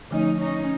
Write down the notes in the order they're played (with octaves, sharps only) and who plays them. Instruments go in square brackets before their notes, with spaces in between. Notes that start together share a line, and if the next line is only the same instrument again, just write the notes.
[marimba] D3 F3 A3 [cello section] C#4 D#4
[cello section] C#4 D#4